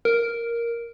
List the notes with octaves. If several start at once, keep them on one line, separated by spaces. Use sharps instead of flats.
A#4